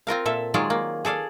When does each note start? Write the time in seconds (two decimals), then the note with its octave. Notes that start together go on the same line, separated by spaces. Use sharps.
0.07 C4 F4 A#4 F5
0.26 A#2 A4 E5
0.54 D#3 F#3 G#3 F4 G#4 D5
0.70 A#3
1.05 G#4 A4 D5 F5